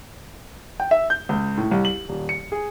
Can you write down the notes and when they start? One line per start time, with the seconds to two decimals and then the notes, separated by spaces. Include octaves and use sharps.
0.80 G5
0.91 E5
1.10 G6
1.29 C#2
1.57 A2
1.71 C2
1.85 F#7
2.09 D#1
2.29 C#7
2.52 G#4